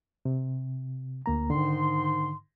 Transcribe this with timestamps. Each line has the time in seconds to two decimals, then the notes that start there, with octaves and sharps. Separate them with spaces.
0.25 C3
1.26 D2 A#3 A#5
1.50 G#2 D3 D#3 C6